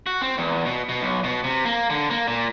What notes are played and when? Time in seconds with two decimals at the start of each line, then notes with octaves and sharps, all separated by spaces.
0.06 F#4
0.21 C4
0.38 E2
0.65 B2
0.89 B2
1.01 B1
1.24 B2
1.44 C3
1.65 A#3
1.90 D3
2.10 A#3
2.28 A#2